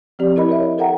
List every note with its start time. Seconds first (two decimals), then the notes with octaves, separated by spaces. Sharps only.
0.19 F3 C4 G4 D5
0.36 E4 A#4 D#5 B5
0.49 A#4 C#5 E5
0.78 A4 A#4 E5 F#5 G5 A#5